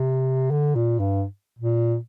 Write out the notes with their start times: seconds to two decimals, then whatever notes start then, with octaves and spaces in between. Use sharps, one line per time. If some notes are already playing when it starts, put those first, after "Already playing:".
Already playing: C3
0.51 D3
0.76 A#2
0.99 G2
1.59 A#2